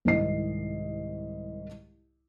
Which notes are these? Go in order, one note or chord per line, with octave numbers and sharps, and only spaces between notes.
C2 G#2 D#3 E4 D#5 C7